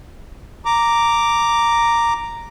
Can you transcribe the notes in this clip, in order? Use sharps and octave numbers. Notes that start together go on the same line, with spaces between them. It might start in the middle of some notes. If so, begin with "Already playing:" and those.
A#5 D6